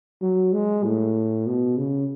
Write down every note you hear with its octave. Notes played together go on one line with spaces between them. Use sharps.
F#3
G#3
A2
B2
C#3